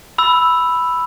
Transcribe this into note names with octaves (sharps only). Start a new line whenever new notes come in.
B5 E6